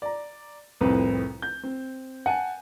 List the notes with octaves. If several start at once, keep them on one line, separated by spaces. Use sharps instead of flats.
D5 A#5
C2 F2 A2 C4 B4
G6
C4
F#5 G#5 A5